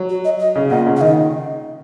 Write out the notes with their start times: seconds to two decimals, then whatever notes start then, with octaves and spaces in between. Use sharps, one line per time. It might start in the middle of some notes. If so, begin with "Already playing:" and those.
Already playing: F#3
0.09 F#4
0.25 D#5
0.39 D#5
0.55 C#3
0.70 A#2 F#5
0.86 C#3
0.96 F#5
1.01 D#3 D#5